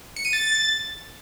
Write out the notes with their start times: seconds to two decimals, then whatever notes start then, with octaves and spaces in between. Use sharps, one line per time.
0.16 C#7
0.25 D#7
0.33 A6